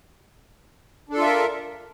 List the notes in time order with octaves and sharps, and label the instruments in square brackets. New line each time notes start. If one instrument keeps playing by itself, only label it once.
[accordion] D4
A4
F4
E5
A#4